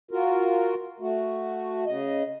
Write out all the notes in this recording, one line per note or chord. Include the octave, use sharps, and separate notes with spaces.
F4 F#4 A#4
A3 F#4
C#3 D#5